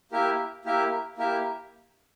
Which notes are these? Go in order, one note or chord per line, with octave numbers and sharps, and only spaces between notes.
A#3 E4 G4 A#4 E5
A#3 E4 G4 A#4 E5
A#3 E4 G4 A#4 E5